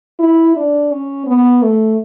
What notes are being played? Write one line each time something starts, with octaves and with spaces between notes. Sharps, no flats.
E4
D4
C#4
B3
A3